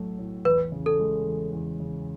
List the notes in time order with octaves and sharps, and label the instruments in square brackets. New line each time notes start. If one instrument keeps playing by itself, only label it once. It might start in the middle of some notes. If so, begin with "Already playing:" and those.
Already playing: [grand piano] B1 A2 F#3 A3
A2
[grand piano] E2 [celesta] B4
[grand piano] C#3
[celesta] A4
[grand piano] G#3
E2
E2
C#3